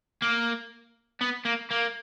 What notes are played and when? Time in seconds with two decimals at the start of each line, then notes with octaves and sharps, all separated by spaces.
0.22 A#3
1.21 B3
1.45 A#3
1.71 A#3